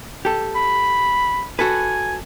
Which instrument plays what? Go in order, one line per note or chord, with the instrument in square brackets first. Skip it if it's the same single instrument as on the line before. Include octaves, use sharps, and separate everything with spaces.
[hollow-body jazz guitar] G4 A4
[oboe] B5
[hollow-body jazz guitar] F#4 A4 B4 [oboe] G#5